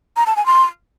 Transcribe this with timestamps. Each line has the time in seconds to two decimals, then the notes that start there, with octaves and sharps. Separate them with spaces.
0.17 A#5
0.26 A5
0.36 G#5
0.46 C6